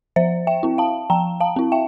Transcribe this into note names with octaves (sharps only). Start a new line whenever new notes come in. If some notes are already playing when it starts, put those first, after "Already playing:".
F3 C5 E5
E5 G5
C4 E4
F5 A5
F3 G5 A#5
F5 A5
C4 E4
E5 G5